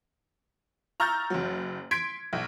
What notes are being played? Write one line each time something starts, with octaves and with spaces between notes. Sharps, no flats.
A#5 C#6 E6 F6 G6 A6
F#1 F#3
C6 G#6 B6 D7
B1